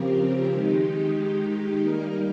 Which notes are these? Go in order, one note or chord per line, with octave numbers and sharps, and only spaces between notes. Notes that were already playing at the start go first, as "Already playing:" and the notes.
Already playing: C#3 F3 C4 G4 A#4
D#3 G#3 D#4 G4
G3 A#3 D#4 A#4